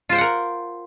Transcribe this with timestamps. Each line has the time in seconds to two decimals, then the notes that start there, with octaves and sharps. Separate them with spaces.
0.09 F4
0.12 C5
0.15 G5
0.18 F#5
0.21 A#4